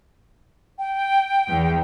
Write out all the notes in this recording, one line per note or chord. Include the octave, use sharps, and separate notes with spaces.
G5
E2